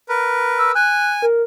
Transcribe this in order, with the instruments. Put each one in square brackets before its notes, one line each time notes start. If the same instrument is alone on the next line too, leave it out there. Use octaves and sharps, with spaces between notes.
[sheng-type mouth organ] A#4 B4
[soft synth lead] E6
[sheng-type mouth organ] G#5 [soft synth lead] F#6
[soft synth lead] A#4